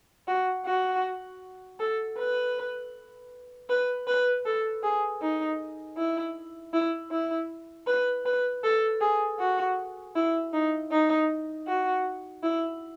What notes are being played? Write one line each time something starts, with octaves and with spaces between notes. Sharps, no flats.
F#4
F#4
A4
B4
B4
B4
A4
G#4
D#4
E4
E4
E4
B4
B4
A4
G#4
F#4
E4
D#4
D#4
F#4
E4